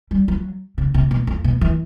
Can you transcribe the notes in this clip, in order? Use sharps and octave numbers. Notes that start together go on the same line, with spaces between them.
G3
F#3
C#3
C3
B2
F2
B2
E3